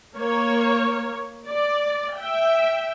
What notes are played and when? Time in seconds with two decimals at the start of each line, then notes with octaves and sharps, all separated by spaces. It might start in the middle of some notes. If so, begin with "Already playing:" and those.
0.16 A#3 C#5
1.48 D5
2.16 E5 G5